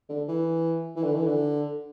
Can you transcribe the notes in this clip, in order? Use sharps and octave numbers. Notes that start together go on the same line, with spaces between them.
D3
E3
E3
D3
E3
D3